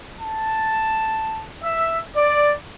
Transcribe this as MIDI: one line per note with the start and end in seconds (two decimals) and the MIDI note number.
0.21 1.46 81
1.63 1.99 76
2.17 2.52 74